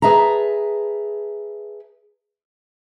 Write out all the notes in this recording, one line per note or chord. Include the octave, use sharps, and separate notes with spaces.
G#4 B4 E5 A5 A#5